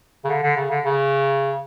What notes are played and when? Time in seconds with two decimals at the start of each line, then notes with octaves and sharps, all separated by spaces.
0.25 C#3
0.28 D3
0.42 D3
0.56 C#3
0.70 D3
0.85 C#3